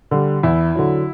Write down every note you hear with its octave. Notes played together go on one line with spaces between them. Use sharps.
D3 G3
E2 E4
D3 F#3